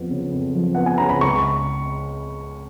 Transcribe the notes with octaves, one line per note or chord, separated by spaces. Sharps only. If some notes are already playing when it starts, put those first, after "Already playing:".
Already playing: F2 F3 B3
C#3
F2
F3
B3 F#5
G#5
C#3 A#5
B5
C#2 C#6